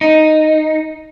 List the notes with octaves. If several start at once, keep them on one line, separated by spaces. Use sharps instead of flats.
D#4